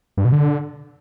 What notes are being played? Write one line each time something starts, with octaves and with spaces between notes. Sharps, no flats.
G2
B2
D3